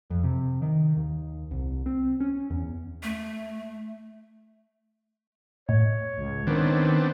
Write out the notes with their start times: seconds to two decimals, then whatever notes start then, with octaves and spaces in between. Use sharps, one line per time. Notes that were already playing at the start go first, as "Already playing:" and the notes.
0.10 F2
0.23 C3
0.62 D#3
0.97 D#2
1.51 C2
1.86 C4
2.20 C#4
2.50 E2
3.03 A3
5.69 A2 C#5
6.18 C#2
6.47 D#3 B3 C4 D4